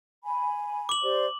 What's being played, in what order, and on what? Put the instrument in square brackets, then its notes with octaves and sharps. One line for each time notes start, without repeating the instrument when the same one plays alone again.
[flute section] G#5 B5
[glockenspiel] D6 F#7
[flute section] G4 C5 D5